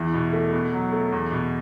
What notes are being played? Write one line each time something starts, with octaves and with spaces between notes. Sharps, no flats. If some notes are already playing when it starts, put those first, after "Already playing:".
Already playing: E2 E3
B2
A3
B2
F#3
A3
E2
B2